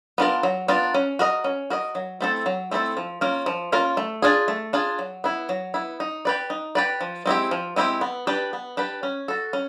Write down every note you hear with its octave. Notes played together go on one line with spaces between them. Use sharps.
B3 D4 F4 A#4
F#3
B3 D4 F4 A#4
C#4
F#4 A#4 D#5
C#4
F#4 A#4 D#5
F#3
A3 C4 E4 A4
F#3
A3 C4 E4 A4
F3
A#3 C#4 F4 A#4
F3
A#3 C#4 F4 A#4
A3
D4 F4 G#4
A3
D4 F4 G#4
F#3
B3 E4
F#3
B3 E4
D#4
G4 B4 D5
D#4
G4 B4 D5
F3
G#3 C4 E4 G4
F3
G#3 C4 E4 G4
B3
D4 G4 B4
B3
D4 G4 B4
C#4
F#4 A4
C#4